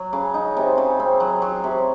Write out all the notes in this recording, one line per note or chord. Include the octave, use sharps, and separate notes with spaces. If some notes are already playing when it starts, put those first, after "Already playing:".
Already playing: F#3
C#3
D#4
C3
C#3
C4
F#3
F#3
C3